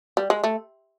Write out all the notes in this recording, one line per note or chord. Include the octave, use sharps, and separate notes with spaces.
G3
G#3
A3